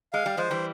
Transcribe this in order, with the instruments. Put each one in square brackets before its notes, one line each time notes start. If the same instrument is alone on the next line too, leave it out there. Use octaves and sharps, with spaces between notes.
[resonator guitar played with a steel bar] G#3 [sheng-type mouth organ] F5
[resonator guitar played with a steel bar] G3
[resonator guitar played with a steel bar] F3 G#3 [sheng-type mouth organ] C5
[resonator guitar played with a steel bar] E3 G3